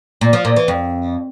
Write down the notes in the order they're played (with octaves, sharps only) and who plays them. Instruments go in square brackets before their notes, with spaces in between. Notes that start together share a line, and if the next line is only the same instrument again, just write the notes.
[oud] A#2
F3
A#2
E3
F2